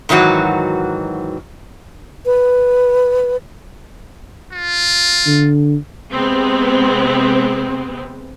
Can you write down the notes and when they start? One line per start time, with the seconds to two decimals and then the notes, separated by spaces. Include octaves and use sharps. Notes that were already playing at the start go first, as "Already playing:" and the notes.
0.09 G#2 D#3 E3 F#3 F#4
2.25 B4
4.53 F4
5.26 D3
6.12 C3 G#3 B3 C4